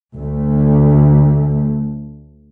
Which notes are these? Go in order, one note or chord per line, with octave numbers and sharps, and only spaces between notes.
D2 A3